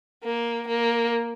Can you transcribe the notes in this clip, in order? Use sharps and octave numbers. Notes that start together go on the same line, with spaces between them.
A#3
A#3